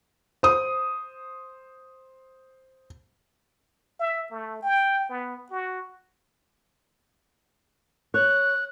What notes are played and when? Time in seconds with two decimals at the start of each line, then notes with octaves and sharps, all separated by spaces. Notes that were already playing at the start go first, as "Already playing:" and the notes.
0.43 C5 D#6
4.00 E5
4.31 A3
4.63 G5
5.09 B3
5.51 F#4
8.14 C#5 F#6